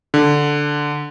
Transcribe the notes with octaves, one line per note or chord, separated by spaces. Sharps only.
D3